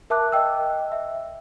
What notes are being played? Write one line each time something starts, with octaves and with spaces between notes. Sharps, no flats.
A#4 E5 A5 D6 F#6
D#5 G5 E6
E5